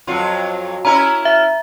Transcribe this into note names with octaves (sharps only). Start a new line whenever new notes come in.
F2 F#3 F4
C#4 E4 A#4 A#5
E5